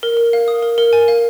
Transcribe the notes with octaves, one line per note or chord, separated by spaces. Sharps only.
A#4
A#4
F5
D#6
A#4
A#4
G#5
F5